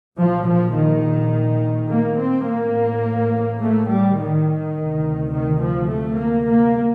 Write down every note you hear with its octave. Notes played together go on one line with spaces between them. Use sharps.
A#1 A#2 F3
F3
D#3
A#3
C4
A1 A2 A#3
A3
G3
D#3
D2 C3
D#3
F3
A3
A#3
A#3